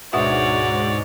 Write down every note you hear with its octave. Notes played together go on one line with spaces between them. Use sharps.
D2 G#2 B2 F#4 C#5 D5 E5